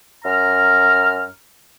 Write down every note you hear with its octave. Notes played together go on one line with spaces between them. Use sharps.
F#2 A#5 F6